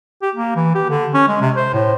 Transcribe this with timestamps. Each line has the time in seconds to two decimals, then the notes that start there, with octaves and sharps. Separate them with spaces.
0.22 G4
0.35 A#3
0.56 E3
0.75 G4
0.89 D3
1.14 C#4
1.28 G#3
1.41 C3
1.56 C5
1.73 A2